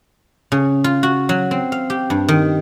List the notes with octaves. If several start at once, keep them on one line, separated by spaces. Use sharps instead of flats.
C#3
F4
F#4
F#3
C4
F5
G4
G2
D#3